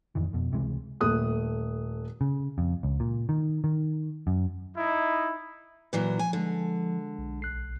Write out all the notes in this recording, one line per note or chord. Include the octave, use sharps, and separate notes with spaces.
A1 F2 D#3 E3
F2 B2
C#2 C3 E3 G#3
D#1 A3 D#6 F#6
C#3
F2
C#2
A#2
D#3
D#3
F#2
D#4 E4
A#2 E3 F#3 B4
F3 G#5
D3 G#3 A4
B1
A1 F#6 C7